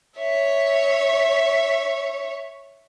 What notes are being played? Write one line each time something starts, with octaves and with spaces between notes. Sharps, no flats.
C#5 E5